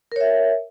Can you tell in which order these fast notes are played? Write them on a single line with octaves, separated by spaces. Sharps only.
A#4 C#5 E5